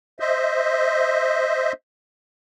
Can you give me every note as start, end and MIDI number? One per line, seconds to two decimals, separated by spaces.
0.20 1.72 72
0.20 1.72 75
0.20 1.72 76